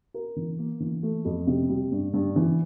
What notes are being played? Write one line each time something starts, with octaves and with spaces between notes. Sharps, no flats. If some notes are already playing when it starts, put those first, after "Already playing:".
A#4
E3
A#3
E3
A3
F2
C3
G3
G2
G2
E3